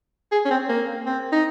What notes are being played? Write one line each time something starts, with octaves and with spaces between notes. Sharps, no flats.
G#4
C#4
C4
A#3
C4
D#4